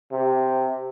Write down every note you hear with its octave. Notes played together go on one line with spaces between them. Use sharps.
C3